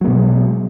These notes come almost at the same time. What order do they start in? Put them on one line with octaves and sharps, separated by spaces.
F#3 A#3 B2 G#3